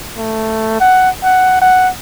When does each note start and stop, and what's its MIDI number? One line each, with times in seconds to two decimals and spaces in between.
0.17 0.78 57
0.80 1.10 78
1.23 1.57 78
1.62 1.89 78